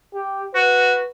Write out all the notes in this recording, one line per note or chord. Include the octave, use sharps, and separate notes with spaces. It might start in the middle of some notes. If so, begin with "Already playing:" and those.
G4
F#4 B4